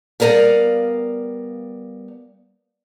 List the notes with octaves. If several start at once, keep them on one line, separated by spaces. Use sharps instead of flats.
G3 B3 A#4 D5 F5